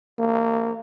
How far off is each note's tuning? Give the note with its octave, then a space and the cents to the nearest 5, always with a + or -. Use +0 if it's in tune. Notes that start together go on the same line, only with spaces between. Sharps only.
A#3 -25